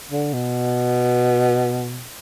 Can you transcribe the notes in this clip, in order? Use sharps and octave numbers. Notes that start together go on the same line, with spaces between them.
D3
B2